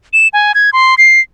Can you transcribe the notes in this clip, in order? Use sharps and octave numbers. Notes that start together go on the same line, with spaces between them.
E7
G#5
G#6
C6
C7